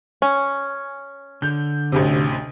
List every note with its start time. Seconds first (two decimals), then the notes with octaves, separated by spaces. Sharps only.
0.22 C#4
1.42 D3 G6
1.92 A1 D2 C3